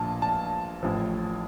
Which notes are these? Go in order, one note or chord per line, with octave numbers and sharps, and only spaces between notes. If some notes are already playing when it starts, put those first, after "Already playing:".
Already playing: A#1 A#2 F3 A5
A5
A1 A2 F3